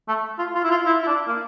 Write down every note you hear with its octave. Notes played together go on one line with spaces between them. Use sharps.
A3
F4
F4
E4
F4
E4
E4
D4
A#3